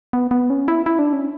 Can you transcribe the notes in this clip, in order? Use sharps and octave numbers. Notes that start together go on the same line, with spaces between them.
B3
B3
C#4
E4
E4
D4
C#4